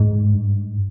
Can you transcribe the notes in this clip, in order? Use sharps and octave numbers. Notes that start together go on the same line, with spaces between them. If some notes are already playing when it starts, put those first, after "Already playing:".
Already playing: G#2
G2